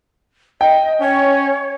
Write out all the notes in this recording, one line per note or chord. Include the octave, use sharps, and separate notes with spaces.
D#5 G5
C#4 C#5